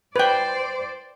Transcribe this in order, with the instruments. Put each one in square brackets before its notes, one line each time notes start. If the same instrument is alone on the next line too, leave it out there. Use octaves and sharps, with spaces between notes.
[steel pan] B4 G5 [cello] C5 D5